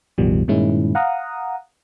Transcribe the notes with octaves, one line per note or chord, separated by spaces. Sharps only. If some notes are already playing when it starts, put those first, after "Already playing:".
A1 E2 B2 D#3 F3 G3
G2 A#2 D#3 G#3 C#4 E4
F5 F#5 A#5 D#6